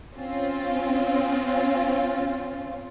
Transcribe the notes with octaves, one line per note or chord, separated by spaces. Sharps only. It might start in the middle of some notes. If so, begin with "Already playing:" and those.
C4 C#4 F4